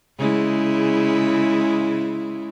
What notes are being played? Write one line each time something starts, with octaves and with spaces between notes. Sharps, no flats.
C#3 G#3 E4